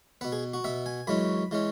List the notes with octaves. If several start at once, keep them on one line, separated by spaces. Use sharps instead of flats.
B2 B3 B4
G#4
F#4
B2 B3 E5
G#5
F#2 E3 G#3 C#4 B5
E3 G#3 C#4